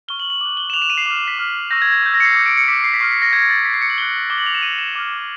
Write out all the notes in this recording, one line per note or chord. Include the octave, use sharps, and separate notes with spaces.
C#6 F6 G7
F#7
F#7
D6 F#6 G7
G7
E7
D6 F#6 F7
E7
D#7
C7
D6 F6 E7
E7
B6
D6 F6
C#6 E6 G6 A#6
G#6
G#6
C#6 E6 G6
A#6
C#7
C7
D6 G6 C#7
D7
C#7
D6 G6 B6
C7
B6
C#6 F6 C7
B6
A#6
C#6 F6 G#6
A6
C#6 F#6 B6
C7
C#7
F#7
C#6 F#6 G7
D6 G6 G7
F#7
F7
E7
D6 G6 D#7
E7
D6 F6